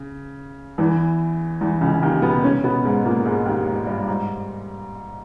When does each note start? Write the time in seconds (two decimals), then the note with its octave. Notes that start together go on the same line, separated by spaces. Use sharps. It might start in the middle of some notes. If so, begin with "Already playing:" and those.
Already playing: C#3
0.78 E2 E3
1.61 E2 E3
1.81 C#2 C#3
2.02 D#2 D#3
2.22 B2 B3
2.43 C#3 C#4
2.63 B2 B3
2.85 G#2 G#3
3.05 A#2 A#3
3.25 G#2 G#3
3.45 D#2 D#3
3.67 G#2
3.87 G2
4.07 G#2